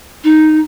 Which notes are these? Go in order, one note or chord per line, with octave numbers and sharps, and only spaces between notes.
D#4